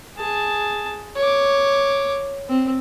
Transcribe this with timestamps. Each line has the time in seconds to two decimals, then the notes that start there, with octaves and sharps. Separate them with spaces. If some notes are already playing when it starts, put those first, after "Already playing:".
0.17 G#4 A5
1.16 C#5 D6
2.49 C4